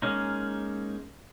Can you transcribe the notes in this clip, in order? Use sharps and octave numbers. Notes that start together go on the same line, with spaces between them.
G#3 A#3 C#4 D#4